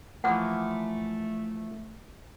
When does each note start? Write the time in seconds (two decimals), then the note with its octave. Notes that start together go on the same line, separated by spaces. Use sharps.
0.24 E3 F3 A3 A#3 F#5